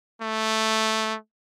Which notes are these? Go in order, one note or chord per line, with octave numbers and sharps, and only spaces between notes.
A3